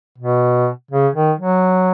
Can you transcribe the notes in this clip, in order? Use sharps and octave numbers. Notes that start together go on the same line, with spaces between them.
B2
C#3
D#3
F#3